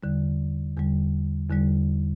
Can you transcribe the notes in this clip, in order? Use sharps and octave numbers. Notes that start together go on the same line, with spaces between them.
E2 D3 G3
E2 D3 G3
E2 D3 G3